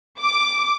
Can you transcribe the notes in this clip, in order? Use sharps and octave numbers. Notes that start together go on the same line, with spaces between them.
D6